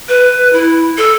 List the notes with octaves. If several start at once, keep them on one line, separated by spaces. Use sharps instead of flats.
B4
E4
A4